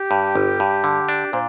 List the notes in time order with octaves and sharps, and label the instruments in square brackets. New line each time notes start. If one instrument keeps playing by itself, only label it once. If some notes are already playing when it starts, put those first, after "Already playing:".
Already playing: [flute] G4
[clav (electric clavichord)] G2
G1
G2
D3
D4
[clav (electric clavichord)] A#2 [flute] C5